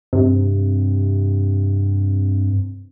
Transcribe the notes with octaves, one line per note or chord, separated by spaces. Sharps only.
G2 C3